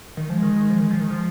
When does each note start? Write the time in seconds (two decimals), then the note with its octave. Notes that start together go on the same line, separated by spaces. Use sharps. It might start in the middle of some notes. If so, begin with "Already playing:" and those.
0.17 D#3
0.30 F3 G#3
0.43 D#3
0.56 D#3
0.70 F3
0.80 D#3
0.91 F3
1.00 D#3
1.10 F3